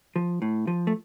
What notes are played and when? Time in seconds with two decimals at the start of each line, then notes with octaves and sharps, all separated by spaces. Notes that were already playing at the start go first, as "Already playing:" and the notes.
0.16 F3
0.42 A2
0.67 F3
0.87 A3